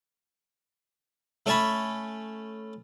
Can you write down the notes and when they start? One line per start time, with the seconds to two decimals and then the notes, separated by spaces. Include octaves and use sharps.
1.46 A3 C#4 C#5 A5 B5